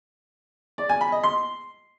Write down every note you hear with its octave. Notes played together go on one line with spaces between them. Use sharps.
D5
G#5
B5
D#5
C6